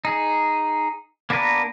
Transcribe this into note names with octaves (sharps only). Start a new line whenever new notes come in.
D#4 G#4
A#3 B3 D4 A#4 B4